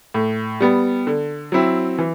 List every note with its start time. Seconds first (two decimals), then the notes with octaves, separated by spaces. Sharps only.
0.14 A2
0.60 G3 B3
1.07 D3
1.52 F#3 C4 E4
1.99 E3